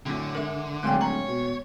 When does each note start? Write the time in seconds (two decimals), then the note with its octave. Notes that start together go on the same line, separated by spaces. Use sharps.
0.06 F#2 A2 D3
0.35 G#2 A#4 E5
0.83 D1 A#1 G#3 A3 C#4 G5 C6
1.01 C#5 A#5
1.28 B2